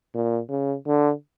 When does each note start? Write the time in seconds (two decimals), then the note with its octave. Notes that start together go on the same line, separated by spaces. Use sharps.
0.15 A#2
0.50 C#3
0.86 D3